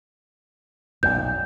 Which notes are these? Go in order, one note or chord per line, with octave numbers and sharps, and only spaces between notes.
B1 F#2 A#2 G6